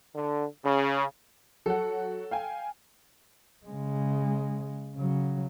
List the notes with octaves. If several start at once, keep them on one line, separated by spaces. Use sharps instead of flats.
D3
C#3
F#3 A4 F#5
F5 G5 G#5
C#3 G#3
C#3 F#3